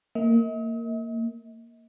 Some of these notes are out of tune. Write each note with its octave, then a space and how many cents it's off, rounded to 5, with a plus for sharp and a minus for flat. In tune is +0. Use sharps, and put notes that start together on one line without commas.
A#3 -15 D#5 +45